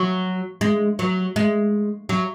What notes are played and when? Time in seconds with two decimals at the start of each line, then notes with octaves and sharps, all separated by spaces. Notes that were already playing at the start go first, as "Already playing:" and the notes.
Already playing: F#3
0.61 G#3
0.99 F#3
1.36 G#3
2.09 F#3